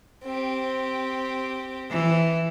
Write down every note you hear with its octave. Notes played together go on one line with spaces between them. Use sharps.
C4 G4
E3